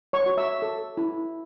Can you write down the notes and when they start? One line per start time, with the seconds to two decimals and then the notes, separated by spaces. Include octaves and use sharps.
0.13 C#5 C#6
0.26 F#4
0.37 E5 E6
0.62 A4
0.97 E4